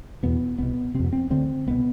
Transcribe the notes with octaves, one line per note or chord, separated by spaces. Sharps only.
E2 B2 B3
C2 B2 B3
F2 C3 C4
B3
C4
D2 D3 C4
C2 B2 B3